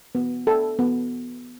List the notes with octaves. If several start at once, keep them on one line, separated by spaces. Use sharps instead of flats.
B3
A4
B3